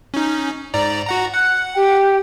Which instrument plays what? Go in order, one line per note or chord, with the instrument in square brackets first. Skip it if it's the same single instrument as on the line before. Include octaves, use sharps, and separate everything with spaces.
[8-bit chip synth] C#4 D#4
G#2 D5 A#5
F#4 F#5 A#5
[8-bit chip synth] F#5 [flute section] F#6
[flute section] G4 G5